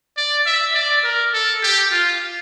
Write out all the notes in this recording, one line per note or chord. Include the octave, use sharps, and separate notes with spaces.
D5
E5
D5
A#4
A4
G4
F4